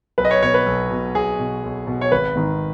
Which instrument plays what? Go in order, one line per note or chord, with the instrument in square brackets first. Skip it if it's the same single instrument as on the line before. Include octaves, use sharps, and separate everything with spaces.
[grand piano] B1 B4
D#5
C#5
B2 C#5
B4
B1
B2
B1 G#4
B2
B1
B2
C#5
G#1 B4
G#2 D#3